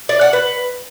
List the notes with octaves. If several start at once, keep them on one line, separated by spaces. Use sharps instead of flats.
D5
F#5
B4